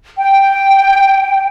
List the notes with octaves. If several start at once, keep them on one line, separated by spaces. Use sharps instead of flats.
G5